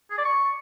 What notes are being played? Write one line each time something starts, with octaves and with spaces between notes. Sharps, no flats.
G#4
D5
C#6